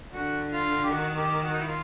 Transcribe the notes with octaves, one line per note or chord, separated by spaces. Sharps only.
D3 F#4
F4
G4
D#3 F#4
G4
F#4
D#4
E4
F4